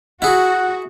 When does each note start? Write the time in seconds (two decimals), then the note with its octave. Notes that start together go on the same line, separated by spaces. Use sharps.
0.22 E4 F#4 G#4 F#5